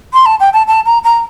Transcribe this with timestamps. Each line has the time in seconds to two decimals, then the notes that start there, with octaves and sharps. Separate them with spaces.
0.13 C6
0.26 A5
0.40 G5
0.53 A5
0.68 A5
0.86 A#5
1.04 A#5